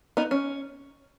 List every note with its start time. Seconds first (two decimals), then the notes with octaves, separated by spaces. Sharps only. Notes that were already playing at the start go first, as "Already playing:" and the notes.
0.17 B3 D#4
0.31 C#4